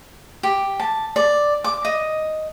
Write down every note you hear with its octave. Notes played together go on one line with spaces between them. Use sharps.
G4
A5
D5
D6
D#5